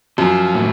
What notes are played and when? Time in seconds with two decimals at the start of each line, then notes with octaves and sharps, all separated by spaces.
0.18 F#2 F3
0.54 A2